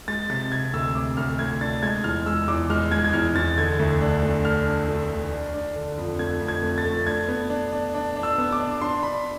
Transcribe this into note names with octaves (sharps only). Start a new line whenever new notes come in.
G#3 A6
C3 A6
C3 G#6
D2 E6
C3 D6
D2 F6
D2 G#6
D4 A6
G#3 G#6
E2 F6
G#3 E6
E2 D6
G#3 F6
G#3 G#6
G#6
E2 F6
E2 A6
D3 G#6
D2
D4
A3
D4 F6
D4
A3
D2
D4
D4
D3
F2
A3 G#6
F2
G#6
A3
A6
A3
D4 G#6
B3
D4
D4
D4
D4
E6
B3
D6
D4
D4 C6
D4 B5